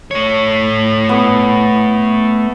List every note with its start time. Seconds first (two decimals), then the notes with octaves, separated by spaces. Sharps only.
0.11 A3 C#5
1.09 B3